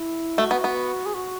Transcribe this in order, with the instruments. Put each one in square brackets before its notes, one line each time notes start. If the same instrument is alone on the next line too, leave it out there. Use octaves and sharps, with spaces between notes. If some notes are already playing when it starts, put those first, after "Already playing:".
Already playing: [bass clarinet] E4
[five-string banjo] A3 [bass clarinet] F#4
[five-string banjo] B3
B3
[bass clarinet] G#4
F#4